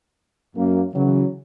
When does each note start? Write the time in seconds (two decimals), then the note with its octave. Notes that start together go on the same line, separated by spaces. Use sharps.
0.56 F#2 A#3
0.94 C#3 E3 F#3